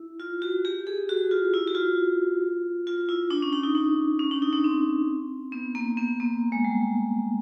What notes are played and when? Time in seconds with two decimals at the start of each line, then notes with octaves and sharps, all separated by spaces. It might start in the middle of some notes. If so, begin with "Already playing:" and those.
Already playing: E4
0.20 F4
0.42 F#4
0.65 G4
0.87 G#4
1.09 F#4
1.31 F4
1.54 E4
1.67 F#4
1.75 F4
2.87 F4
3.09 E4
3.30 D4
3.42 C#4
3.52 D4
3.63 D#4
3.75 D4
4.19 C#4
4.31 D4
4.42 D#4
4.53 D4
4.64 C4
5.52 B3
5.75 A#3
5.97 B3
6.20 A#3
6.52 G#3
6.64 G3